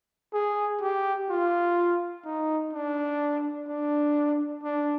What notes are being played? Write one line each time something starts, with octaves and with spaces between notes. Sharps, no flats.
G#4
G4
F4
D#4
D4
D4
D4